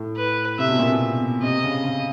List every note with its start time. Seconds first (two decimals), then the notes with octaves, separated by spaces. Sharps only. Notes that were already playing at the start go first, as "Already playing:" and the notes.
Already playing: A2
0.16 B4
0.59 C3 E5
0.69 B2
0.79 A#2
0.90 B2
1.42 C3 D#5
1.64 C#3
1.85 C#3